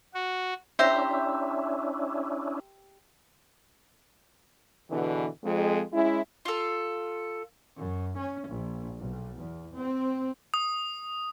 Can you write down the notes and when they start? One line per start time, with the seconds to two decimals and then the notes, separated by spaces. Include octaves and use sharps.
0.14 F#4
0.79 C#4 D4 E4 G4 C5 E5 A#5
4.90 E2 B2 D3 E3
5.44 F2 G#3
5.93 G#3 C#4 E4
6.45 F4 A4
7.78 F#2
8.18 C#4
8.48 A#1
8.98 B1
9.40 E2
9.75 C4
10.54 D#6